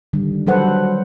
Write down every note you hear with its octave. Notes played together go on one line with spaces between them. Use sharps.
D3 D#3 G3
F#3 G3 A4 B4 C5 F#5